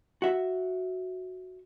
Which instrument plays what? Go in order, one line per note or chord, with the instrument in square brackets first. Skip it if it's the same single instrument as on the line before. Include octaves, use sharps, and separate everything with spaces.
[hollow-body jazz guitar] F#4 E5